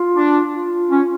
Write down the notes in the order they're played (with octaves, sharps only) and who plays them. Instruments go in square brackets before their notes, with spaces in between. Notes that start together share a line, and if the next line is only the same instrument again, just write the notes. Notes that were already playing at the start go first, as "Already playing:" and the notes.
Already playing: [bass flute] F4
[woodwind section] D4
[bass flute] F4
[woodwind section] C#4